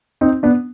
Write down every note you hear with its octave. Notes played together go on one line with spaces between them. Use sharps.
C4 D#4
B3 D4